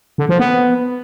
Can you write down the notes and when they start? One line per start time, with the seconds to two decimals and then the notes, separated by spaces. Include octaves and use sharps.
0.18 D3
0.29 F3
0.40 B3